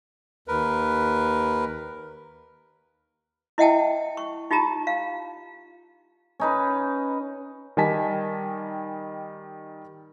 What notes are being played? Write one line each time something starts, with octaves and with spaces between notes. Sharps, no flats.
D#2 A#4 B4
E4 D#5 E5 F#5 G5 A5
C#6
D#4 F4 G4 A5 A#5
F5
C#4 D#4 B4
D#3 G3 D#5 G#5 A5 B6